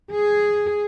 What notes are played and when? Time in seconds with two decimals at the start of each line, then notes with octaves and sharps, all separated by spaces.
0.12 G#4